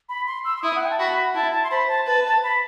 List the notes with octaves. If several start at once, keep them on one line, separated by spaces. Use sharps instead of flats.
B5
C6
E6
C6
E4 D#6
F#5
G5
A5
F#4 B5
E4 A5
A5
C6
C5 B5
A5
B4 A5
A5
B5